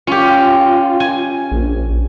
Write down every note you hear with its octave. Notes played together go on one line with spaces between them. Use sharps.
C#4 F4 G4
G#5
A#1